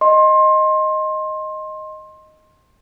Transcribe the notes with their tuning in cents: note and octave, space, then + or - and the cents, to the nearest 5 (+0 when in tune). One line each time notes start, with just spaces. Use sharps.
D#5 +0 C6 +25